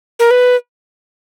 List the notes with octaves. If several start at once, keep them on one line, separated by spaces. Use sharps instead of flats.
A#4
B4